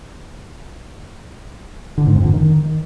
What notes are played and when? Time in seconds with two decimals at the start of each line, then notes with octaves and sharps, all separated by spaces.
1.98 D3
2.07 G#2
2.16 F2
2.25 D3
2.33 D#3